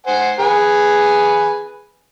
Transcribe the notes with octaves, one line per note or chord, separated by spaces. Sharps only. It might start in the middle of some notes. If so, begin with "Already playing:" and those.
C5 F#5 G#5
G#4 B4 G#5